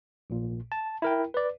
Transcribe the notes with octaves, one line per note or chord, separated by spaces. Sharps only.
A#1 A#2
A5
E4 A#4 G5
B4 D5